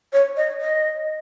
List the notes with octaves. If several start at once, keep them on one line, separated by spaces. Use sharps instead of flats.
C#5
D#5
D#5